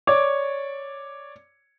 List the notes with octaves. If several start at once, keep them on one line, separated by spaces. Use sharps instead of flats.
C#5 D5 D6